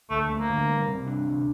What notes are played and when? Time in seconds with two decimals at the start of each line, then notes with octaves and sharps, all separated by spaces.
0.10 D2 A3
0.29 A3
0.39 A#3
0.49 D3
0.69 G3
0.88 C3
1.07 D4
1.27 D2